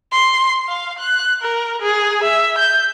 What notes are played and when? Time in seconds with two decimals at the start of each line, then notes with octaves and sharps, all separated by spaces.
0.12 C6
0.68 F5
0.98 F#6
1.42 A#4
1.81 G#4
2.23 E5
2.58 G6